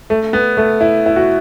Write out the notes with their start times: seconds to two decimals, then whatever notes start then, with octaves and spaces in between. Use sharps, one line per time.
0.10 A3
0.33 B3
0.57 A3
0.81 E4
1.06 E4
1.16 F#4